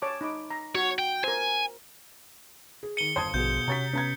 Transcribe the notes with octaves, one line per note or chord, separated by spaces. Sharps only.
C#5 A5 D6
D#4 B5 D6
A#5
F#4 C#5
G5
A#4 C5 G#5
G#4
D#3 C#7 D#7 G7
G1 C5 A5 D#6 G#6
A#1 B2 G#4 G6
C3 C#4 F#4 A#5 A6 B6
B3 C#4 A#5 G#6